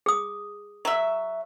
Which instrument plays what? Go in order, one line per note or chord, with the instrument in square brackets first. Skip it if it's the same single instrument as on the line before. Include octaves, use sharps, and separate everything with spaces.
[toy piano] G#4 D#6
[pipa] F#3 E5